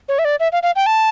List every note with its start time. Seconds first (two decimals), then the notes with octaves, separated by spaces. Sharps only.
0.08 C#5
0.19 E5
0.25 D5
0.40 E5
0.52 F5
0.63 F5
0.76 G5
0.86 A5